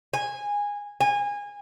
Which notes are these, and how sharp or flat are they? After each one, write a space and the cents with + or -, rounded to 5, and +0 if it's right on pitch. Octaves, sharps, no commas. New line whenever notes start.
G#5 -15
G#5 -25